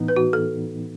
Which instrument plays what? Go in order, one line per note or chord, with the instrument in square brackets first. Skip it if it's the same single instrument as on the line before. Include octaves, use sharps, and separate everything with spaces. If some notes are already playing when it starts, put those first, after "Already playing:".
Already playing: [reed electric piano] A2 E3 B3 D#4
[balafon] B4
F#4
A4